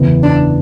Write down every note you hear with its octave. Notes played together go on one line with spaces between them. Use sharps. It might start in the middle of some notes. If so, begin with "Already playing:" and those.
Already playing: F#1 E2 C#3 E3 B3
D4